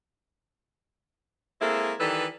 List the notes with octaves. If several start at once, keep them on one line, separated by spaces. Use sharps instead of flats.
G#3 A#3 C4 E4 G#4 A4
D#3 E3 G3 A4 B4